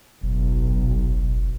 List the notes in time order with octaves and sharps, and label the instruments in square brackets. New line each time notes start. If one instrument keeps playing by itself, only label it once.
[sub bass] F#1 [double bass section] B1